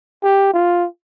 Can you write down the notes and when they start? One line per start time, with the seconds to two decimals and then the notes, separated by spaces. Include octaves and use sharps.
0.24 G4
0.54 F4